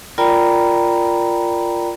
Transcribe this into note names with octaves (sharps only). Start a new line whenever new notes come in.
F4 A#4 D5 G5 A#5 B5